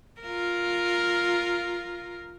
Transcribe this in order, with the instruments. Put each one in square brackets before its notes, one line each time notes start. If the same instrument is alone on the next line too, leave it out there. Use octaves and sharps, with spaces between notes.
[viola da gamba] F4 A#4